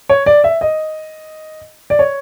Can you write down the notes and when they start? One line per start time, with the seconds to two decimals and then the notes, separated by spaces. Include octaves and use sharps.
0.09 C#5
0.26 D5
0.44 E5
0.61 D#5
1.90 D5
1.99 C#5